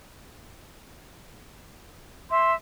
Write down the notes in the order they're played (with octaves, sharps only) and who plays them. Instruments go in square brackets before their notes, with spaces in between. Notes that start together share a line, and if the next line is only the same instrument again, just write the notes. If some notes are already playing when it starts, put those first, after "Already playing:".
[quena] E5 [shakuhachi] C6